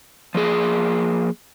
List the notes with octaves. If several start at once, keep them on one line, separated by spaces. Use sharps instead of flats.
F3 A#3 G#4